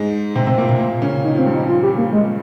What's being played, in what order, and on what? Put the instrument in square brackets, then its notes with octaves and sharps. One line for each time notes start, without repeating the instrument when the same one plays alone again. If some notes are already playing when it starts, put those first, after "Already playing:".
Already playing: [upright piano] G#2 G#3
C3 C4
C3 C4
A#2 A#3
C3 C4
A#2 A#3
C#3 C#4
[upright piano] D#3 [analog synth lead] D#4
[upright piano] F3 [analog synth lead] C4
[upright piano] G2 G3
[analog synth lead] D#4
F4
G4
A#3
G#3